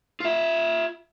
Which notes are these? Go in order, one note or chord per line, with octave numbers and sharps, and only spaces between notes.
F4 E5